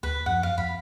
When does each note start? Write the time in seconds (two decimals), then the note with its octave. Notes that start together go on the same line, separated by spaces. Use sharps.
0.03 D2 B4
0.26 F#2 F3 F#5
0.43 F5
0.58 F2 B5